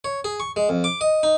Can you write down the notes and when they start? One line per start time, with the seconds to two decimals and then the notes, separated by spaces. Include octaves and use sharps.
0.04 C#5
0.25 G#4
0.40 C#6
0.56 G#3
0.69 F2
0.84 D6
1.01 D#5
1.23 D#4